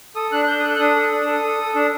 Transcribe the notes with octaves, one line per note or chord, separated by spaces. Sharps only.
A4 D#6
D4 F#6
F#6
D4 G6
D#6
A4 F#6
F#6
D4 D#6
A4
D4
A4
A4
A4
D4